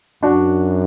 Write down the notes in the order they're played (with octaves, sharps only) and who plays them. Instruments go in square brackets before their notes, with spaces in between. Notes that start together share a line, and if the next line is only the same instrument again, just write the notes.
[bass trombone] F#2 [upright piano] D4 F#4